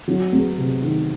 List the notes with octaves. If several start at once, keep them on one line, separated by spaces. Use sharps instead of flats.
F#3
E2
C3
D#3